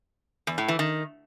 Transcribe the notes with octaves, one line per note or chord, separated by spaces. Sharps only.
E2
A2
E3
D#3